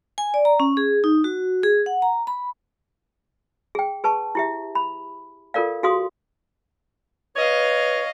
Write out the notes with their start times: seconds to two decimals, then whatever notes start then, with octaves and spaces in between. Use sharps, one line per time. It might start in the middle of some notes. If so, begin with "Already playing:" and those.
0.18 G#5
0.34 D5
0.45 A#5
0.60 C#4
0.77 G#4
1.04 D#4
1.24 F#4
1.63 G#4
1.86 F#5
2.02 A#5
2.27 B5
3.75 G#4 G5
4.04 G#4 B4 A5 C#6
4.35 E4 G4 E5
4.75 B5
5.54 F4 A4 A#4 D5 F5
5.83 F#4 G#4 F5 C6 D#6
7.36 B4 C#5 D#5 F5